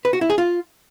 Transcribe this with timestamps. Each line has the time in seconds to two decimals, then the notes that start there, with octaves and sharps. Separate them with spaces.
0.05 B4
0.13 F#4
0.21 E4
0.30 G#4
0.38 F4